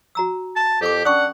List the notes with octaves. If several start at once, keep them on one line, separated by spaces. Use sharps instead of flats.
F#4 A#5 E6
A5
F2 G4 A4 A#4 D6
C#4 D4 F#5 C#6 D#6